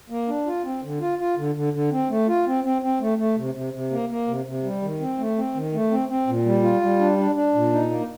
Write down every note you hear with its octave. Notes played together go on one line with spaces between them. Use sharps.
A#3
D4
F4
C4
D3
F4
F4
D3
D3
D3
C4
A3
F4
C4
C4
C4
A3
A3
C3
C3
C3
A#3
A#3
C3
C3
G3
D#3
C4
A3
C4
D#3
A3
C4
C4
A#2
G3
F4
G3
D4
D4
D4
A#2
D#4
A#3